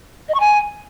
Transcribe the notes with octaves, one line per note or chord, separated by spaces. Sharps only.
D#5
C#6
G#5